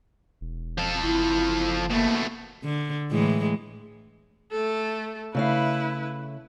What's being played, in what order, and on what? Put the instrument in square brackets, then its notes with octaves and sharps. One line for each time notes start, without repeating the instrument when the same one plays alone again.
[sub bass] E1
[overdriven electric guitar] F3 A4
[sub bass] F#1 [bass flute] E4
[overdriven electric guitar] B2 A3 [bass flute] A#3
[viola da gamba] D3
A2 E3 G#3
[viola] A3 A4
[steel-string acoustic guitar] C#3 A3 F5 [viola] E4 B4